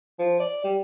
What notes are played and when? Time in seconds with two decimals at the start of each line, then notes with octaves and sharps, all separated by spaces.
0.19 F3
0.40 D5
0.64 G3